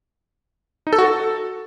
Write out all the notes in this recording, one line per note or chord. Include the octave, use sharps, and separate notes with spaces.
D#4
A4
F#4
A4